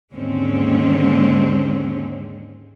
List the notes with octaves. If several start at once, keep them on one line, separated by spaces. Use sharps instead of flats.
D#2 G#2 D3 G#3 C4 C#4